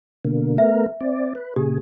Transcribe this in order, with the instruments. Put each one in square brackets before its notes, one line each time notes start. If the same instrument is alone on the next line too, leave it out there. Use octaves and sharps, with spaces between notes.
[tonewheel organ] B2 D3 A#3
[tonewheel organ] A3 B3 A#4 [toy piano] E5
[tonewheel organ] C4 D5
B4
[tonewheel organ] A#2 C#3 G#4 [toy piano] G4